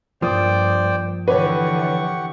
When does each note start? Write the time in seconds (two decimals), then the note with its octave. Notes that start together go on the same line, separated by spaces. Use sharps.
0.22 G2 F3 A#3 C5 D5 G5 D#6
1.28 D3 E3 G4 B4 C#5 F#5 C#6